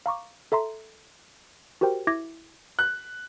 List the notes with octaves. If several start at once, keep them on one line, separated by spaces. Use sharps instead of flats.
F5 A#5 C#6 D6
A4 E5 A#5 C6
F#4 G4 A#4 C5 G5
E4 E5 D6 G#6 A#6
F#6